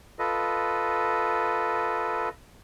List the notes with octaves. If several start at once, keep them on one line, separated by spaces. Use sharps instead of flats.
F4 A4 B4 D#5